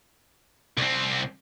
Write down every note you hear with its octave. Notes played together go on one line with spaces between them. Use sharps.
C2 C4